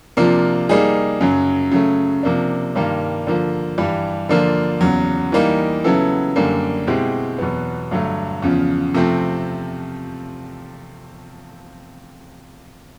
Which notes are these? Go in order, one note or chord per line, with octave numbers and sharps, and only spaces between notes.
C3 F3 A#3 D4 F4
G3 A#3 D#4 G#4
F#2 C#3 F#3
C#3 F#3 A3
C3 F3 A#3 D4
G2 D#3 G3 A#3
D3 F3 A#3
G2 E3 G3
D3 F3 A#3 D4 F4
E2 C#3 F#3
E3 G3 A#3 D#4
C#3 F#3 B3 E4 A4
F#2 D3 G3 A#3
B2 G#3 C4 E4 G4
E2 B2 F#3 B3
G2 D3 F#3 A3
E2 C#3 F3
C3 F3 A3 C4